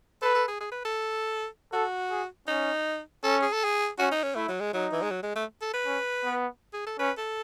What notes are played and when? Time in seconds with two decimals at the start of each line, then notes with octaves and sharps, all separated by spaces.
0.22 A4 B4
0.35 A4
0.48 G#4
0.61 G#4
0.72 B4
0.85 A4
1.73 F#4 A4
2.10 G#4
2.48 C#4 D#4
3.23 C#4 A4
3.42 G#4
3.53 A4
3.64 G#4
3.99 C#4 F#4
4.12 D#4
4.23 C#4
4.36 A3 E4
4.49 F#3
4.60 G#3
4.74 F#3 D#4
4.93 E3
5.02 G#3
5.11 F#3
5.23 G#3
5.36 A3
5.61 A4
5.74 B4
5.86 C#4
6.24 B3
6.74 G#4
6.87 A4
6.99 C#4 B4
7.18 A4